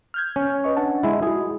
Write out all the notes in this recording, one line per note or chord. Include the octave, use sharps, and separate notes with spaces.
F6 G6 G#6
C#4
B4 D#5 C#6
D4 F#5 A5
G#3 E4
E4 F#4 G#4